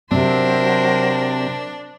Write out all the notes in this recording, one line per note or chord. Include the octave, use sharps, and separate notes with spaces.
C3 F#3 C4 D4 A#4 C5